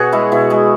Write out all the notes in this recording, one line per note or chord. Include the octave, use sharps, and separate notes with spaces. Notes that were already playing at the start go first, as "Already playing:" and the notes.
Already playing: B2 F#4 G#4 C#5
G#3 E4
B2 E4
G#3 G#4